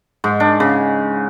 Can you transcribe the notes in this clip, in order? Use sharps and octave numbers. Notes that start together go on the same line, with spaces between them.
G#2
D4
C#3